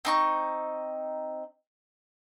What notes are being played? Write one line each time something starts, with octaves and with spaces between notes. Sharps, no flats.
C4 D#4 C#6